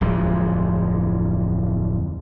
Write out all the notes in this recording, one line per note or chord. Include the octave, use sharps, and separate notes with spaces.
D1 F2 F3 G#3